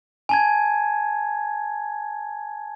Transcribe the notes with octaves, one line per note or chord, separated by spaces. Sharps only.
G#5 A5 G#6